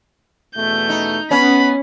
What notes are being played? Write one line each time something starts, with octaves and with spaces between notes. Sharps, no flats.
E2 B2 A3 G6
D#4
B3 C#4 B5